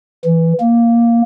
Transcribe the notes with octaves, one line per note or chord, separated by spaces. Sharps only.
E3
A#3